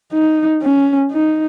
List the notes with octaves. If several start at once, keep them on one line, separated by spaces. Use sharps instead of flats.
D#4
C#4
D#4